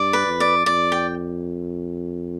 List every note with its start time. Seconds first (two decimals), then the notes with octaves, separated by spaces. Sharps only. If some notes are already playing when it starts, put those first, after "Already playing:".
Already playing: G2 D5
0.13 B4
0.27 F2
0.40 D5
0.66 F2 D5
0.92 G5